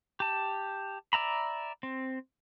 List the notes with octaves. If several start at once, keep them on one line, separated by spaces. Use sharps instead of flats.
G4 A5
D5 E5 A#5 B5
C4